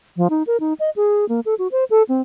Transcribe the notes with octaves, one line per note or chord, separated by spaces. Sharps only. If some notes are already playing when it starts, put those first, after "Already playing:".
F3
D#4
A#4
D#4
D#5
G#4
A#3
A4
F#4
C5
A4
C4